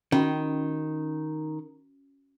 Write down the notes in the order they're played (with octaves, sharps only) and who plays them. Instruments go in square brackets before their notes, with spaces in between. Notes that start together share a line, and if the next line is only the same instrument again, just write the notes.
[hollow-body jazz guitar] D#3 [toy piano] C#4 F#4 B5